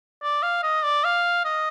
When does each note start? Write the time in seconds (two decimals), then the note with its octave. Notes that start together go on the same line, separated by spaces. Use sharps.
0.23 D5
0.42 F5
0.63 D#5
0.83 D5
1.04 F5
1.45 D#5